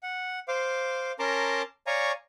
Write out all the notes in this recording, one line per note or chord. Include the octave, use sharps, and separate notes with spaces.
F#5
C5 F5 D6
C#4 A#4 A5 A#5 C6 D6
C#5 D5 F5 G#5 A#5 C#6